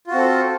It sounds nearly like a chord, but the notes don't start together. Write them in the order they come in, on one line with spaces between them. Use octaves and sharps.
F4 F#4 C4 A4